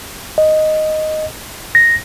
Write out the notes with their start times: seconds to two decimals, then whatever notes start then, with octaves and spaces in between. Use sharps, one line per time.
0.38 D#5
1.75 A#6